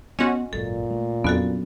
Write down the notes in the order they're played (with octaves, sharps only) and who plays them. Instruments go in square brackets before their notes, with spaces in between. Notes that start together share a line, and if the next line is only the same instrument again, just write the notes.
[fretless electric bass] B3 [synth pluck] C#4 F#4 [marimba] D#5 C6
[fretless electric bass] G#1 F#2 [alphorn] A#2 [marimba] A4
[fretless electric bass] A3
[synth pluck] F2 [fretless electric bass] F#3 C#4 D4 [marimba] B3 F#4 A4